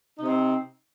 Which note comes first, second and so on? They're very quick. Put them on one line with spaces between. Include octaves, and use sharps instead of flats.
D#4 C3 C4